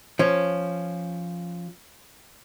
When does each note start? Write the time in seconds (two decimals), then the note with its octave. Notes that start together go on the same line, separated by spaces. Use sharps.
0.19 F3 C#4